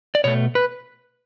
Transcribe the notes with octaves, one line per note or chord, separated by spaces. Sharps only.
D5
B2 A3 C#5
B4